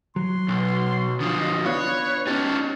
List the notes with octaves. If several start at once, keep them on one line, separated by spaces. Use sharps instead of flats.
F#3 C6
B1
D3 F3 D#6
D#5
B3 D4 F4 B4 C#5
C#4 D#4 G4 A5